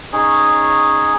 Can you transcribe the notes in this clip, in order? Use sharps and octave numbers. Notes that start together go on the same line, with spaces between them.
C#4 D#4 G#4 C#5